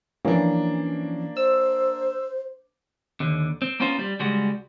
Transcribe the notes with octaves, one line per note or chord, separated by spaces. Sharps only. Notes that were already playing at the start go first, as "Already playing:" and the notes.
E3 F3 A#3 C#4 D4
C5 E6
D#2 D3
C4
A#3 B3 C#4 F4 C5
G3
C#2 G3 G#3 F#4